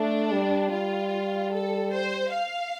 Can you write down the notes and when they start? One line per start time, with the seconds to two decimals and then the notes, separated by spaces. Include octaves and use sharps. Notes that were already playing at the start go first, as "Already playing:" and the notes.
Already playing: A3 D4
0.32 G3
0.72 G3 F4
1.51 A4
1.92 C5
2.32 F5